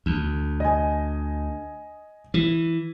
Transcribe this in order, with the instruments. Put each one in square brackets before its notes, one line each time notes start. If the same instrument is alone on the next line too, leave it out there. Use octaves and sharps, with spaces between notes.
[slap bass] D2
[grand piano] D#5 G#5
[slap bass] E3